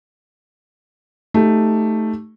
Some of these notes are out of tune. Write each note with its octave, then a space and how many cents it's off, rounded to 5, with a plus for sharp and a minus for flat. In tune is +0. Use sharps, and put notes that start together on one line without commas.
A3 +0 D#4 +0 G4 +0